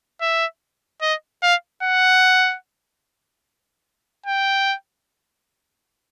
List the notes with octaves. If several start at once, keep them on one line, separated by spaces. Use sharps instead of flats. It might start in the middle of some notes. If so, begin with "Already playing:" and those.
E5
D#5
F5
F#5
G5